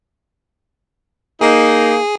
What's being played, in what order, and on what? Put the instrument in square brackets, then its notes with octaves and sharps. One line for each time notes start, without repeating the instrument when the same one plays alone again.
[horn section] A#3 D#4 [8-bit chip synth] G#4